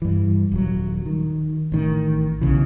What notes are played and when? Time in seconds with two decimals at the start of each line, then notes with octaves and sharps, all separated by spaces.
0.02 G2 E3
0.52 D#1 F#3
1.06 D#3
1.72 A1 D#3
2.41 B1 C#3 E3